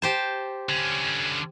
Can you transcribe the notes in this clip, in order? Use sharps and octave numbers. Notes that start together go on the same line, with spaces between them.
G4 C5 A5
D3 C#4